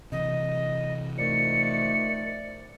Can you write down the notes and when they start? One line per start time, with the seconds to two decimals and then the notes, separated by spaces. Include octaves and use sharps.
0.12 C3 E3 D#5
1.18 D#3 F3 A3 D5 C#7